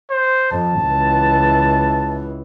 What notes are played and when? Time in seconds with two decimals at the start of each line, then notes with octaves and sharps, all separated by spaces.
0.11 C5
0.52 F2 A5
0.82 C#2 E3